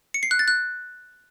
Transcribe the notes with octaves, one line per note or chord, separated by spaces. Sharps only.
C#7
C7
F#6
A6
F#6